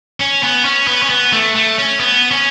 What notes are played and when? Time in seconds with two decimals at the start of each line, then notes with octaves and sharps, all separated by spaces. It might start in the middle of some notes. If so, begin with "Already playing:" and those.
0.20 C#4
0.43 B3
0.65 C#4
0.87 B3
1.02 C#4
1.10 B3
1.33 A3
1.56 A3
1.78 C#4
2.00 B3
2.31 C#4